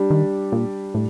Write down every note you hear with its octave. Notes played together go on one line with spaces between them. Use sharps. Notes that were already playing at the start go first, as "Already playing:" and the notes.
Already playing: G3 D4 G4
D#3
A#2
A2